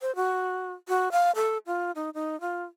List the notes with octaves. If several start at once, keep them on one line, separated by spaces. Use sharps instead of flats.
C5
F#4
F#4
F5
A4
F4
D#4
D#4
F4